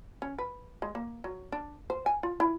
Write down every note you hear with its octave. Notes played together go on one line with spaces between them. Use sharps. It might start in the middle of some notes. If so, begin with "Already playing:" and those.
C#4
B4
G#3
A#3
F#3
D4
C5
G#5
F4
E4